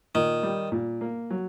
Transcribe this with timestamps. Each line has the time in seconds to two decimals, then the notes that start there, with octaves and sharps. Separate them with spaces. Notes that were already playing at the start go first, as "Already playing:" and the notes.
0.15 A#2 D#3
0.43 G3
0.72 A#2
1.01 A#3
1.31 F#3